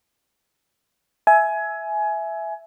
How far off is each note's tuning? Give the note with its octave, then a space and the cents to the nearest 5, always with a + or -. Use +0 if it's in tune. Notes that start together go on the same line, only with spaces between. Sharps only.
E5 +0 G#5 +20